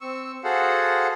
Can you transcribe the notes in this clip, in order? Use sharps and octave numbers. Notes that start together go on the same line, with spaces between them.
C4 C#6 E6
F#4 G#4 A4 C5 F5 F#5